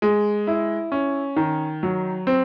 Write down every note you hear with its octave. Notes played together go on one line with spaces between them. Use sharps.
G#3
E4
C#4
D#3
F#3
C4